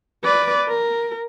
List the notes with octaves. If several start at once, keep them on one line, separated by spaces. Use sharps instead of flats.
B4 D5
A#4